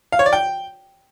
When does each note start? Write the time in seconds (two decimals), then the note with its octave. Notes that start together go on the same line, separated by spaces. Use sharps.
0.12 F5
0.19 C#5
0.26 D5
0.33 G5